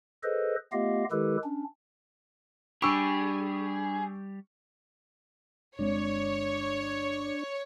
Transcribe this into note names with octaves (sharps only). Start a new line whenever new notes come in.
G#4 A4 B4 C5 D#5
A3 B3 F4 G4 D#5 F5
D#3 G#3 E4 G4 A4 B4
C#4 D4
G3 D4 G4 G#4 B5 C#6 E6 D7
G1 G#3 C4 D4 C#5